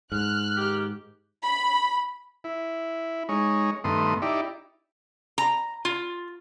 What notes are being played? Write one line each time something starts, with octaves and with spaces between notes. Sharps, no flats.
G#2 F6 F#6
D#3 G4
B5
E4
G#3 D#4 C#5
G2 D#3 A3 B3 C6 D#6
D#4 E4 G4 D5
A#5
F4